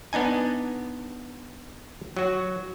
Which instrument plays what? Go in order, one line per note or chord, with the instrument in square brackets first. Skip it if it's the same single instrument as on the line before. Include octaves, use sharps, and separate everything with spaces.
[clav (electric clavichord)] B3 D4 D#4 G#5
F#3 F#4